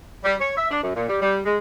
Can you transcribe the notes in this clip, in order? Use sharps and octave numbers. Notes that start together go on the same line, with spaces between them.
G3
C#5
E5
D4
F#2
A#2
G3
G3
G#3